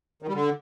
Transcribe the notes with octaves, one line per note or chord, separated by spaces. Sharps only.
D#3
G3
D3